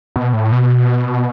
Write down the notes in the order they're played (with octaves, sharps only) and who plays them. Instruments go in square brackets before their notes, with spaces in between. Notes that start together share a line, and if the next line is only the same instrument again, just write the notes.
[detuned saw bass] B2
A2
B2